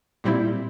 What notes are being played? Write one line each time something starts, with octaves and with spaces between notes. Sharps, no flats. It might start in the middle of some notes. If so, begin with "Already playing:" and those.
A#2 G3 C4 E4